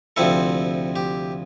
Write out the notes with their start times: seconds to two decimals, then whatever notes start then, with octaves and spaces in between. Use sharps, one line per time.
0.16 D2 C3 F3 C4 E4 A4
0.96 G4